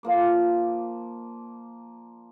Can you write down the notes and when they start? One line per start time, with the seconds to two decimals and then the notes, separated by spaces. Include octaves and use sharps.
0.03 F3 A#3 D5